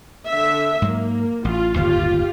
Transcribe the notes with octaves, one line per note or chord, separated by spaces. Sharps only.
D3 E5
G#2 F#3 A#3
A1 F4
D1 G1 D#2 F4 G4